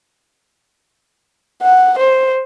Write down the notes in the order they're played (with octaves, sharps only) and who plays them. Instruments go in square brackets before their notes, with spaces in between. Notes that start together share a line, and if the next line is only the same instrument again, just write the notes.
[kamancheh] F#5
C5